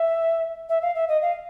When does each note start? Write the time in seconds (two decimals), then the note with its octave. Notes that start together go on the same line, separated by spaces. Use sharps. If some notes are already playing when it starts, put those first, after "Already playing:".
Already playing: E5
0.69 E5
0.82 F5
0.95 E5
1.09 D#5
1.22 F5